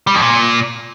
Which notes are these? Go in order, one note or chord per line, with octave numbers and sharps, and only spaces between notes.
G3
F2
A#2